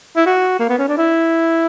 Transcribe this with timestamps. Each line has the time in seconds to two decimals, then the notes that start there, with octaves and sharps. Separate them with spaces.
0.17 E4
0.26 F#4
0.59 A#3
0.69 B3
0.79 C#4
0.88 D4
0.97 E4